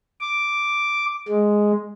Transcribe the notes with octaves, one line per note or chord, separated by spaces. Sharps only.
D6
G#3